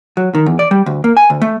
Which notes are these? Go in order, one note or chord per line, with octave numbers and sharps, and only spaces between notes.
F#3
D#3
E2
D5
G3
D2
A#3
G#5
D2
A3